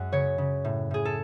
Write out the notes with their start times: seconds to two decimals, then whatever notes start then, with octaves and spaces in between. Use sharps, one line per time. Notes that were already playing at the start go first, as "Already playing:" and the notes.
Already playing: F#2 G#3 F#5
0.12 C#3 C#5
0.38 C#3
0.65 A2
0.91 A2 G#4
1.05 A4